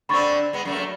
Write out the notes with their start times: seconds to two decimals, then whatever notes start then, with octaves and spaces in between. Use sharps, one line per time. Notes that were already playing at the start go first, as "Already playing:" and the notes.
0.09 D3 C4 B5 C#6 A6
0.53 G#3 B3
0.65 F#2 A3 A#3